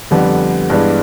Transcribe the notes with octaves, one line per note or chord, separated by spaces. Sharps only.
F2 D3 G3 B3
G2 E3 G#3 B3 D4